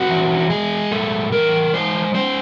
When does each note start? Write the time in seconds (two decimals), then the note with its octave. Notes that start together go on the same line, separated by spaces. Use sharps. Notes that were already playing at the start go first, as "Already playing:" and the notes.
Already playing: C4 F#4
0.09 E3
0.50 G#3 G#4
0.91 A2 A4
1.32 E3 A#4
1.74 G#3 C5
2.14 C#4 C5